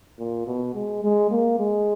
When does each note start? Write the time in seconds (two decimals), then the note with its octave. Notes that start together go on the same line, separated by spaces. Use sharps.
0.19 A#2
0.47 B2
0.75 G#3
1.03 G#3
1.31 A#3
1.59 G#3